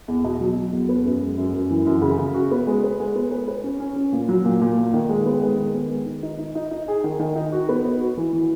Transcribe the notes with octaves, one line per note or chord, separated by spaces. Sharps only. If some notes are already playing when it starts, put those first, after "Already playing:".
E2
B2
F#3
F#3
E2
B3
F#2
G#3
F#2
F#2
E3
F#2
C#3
C#3
F#4
B3
G#3
B4
G#3
B3
B4
B4
C#4
C#4
C#4
A#2
F#3
A#2
A#2
A#2
D#3
G#3
B3
G#3
D#3
B3
G#3
D#3
D#4
D#4
D#4
D#4
G#4
D#3
D#3
D#4
F#4
B3
B3
F#4
E3
E3